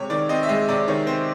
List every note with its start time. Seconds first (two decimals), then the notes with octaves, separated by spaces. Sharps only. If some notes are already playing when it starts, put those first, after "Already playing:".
Already playing: C3 G#3 C#5
0.10 D#3 D5
0.29 C4 D#5
0.43 E5
0.49 G#3 D#5
0.68 C3 D5
0.88 D#3 C#5
1.07 C4 C5